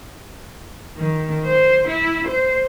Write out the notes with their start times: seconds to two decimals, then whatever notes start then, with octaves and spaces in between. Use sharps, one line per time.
0.97 D#3
1.45 C5
1.87 E4
2.27 C5